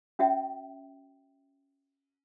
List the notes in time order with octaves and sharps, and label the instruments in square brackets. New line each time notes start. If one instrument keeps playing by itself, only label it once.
[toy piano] C#4 F#4 E5 G5